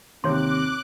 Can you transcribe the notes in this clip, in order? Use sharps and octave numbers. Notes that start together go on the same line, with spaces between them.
D#2 C3 C4 C#5 C6 D6 F#6